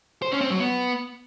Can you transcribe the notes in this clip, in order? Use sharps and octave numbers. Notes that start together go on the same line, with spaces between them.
C5
C#4
C4
F#3
B3